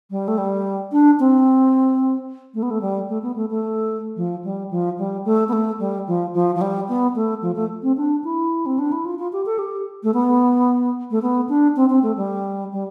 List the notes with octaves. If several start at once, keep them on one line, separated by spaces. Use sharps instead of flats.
G3
A3
G3
D4
C4
A3
B3
A3
G3
A3
B3
A3
A3
F3
G3
F3
G3
A3
B3
A3
G3
F3
F3
F3
G3
B3
A3
F3
A3
C4
D4
E4
C4
D4
E4
F4
F4
G4
A4
G4
A3
B3
A3
B3
D4
C4
C4
A3
G3
G3